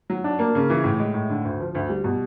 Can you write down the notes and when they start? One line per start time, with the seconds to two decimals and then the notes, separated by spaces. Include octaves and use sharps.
0.10 F#3
0.24 D4
0.39 A#3
0.55 C#3
0.70 E3
0.84 A2
1.00 G#3
1.14 A2
1.30 D3
1.45 D2
1.60 F3
1.75 D2
1.90 G3
2.04 B2